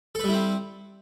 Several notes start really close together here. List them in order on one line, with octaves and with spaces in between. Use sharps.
A4 B4 G3 E4 C4